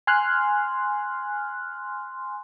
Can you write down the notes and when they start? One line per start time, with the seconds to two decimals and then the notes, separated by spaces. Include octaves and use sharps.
0.07 G#5 C6 F6 F#6